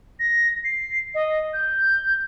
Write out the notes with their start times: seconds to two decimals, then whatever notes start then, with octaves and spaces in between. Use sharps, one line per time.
0.20 A#6
0.64 C7
1.15 D#5
1.54 G6